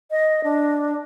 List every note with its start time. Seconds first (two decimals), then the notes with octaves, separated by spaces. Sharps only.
0.11 D#5
0.44 D4